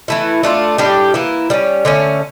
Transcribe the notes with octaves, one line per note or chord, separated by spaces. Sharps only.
E3 A3 E4
A3 D4 F4
A2 G3 D4 G4
E3 A#3 E4
G3 A#3 C#4
D3 A3 C#4